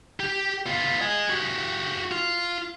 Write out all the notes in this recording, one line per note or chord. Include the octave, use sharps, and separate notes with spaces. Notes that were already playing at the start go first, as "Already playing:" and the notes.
G4
B3 F4
D#5 G#5
F#4 G4
F4